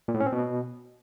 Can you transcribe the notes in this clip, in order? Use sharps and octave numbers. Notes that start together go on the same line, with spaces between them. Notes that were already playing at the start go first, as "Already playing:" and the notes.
A#2
A2
C#4
C4
B2